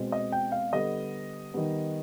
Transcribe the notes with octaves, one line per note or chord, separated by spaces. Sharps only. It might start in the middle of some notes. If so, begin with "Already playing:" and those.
Already playing: B2 G#3 C4
D#5
G5
F5
D3 G3 B3 D#5
D#3 G3 B3